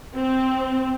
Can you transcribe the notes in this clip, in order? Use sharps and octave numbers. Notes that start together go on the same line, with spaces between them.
C4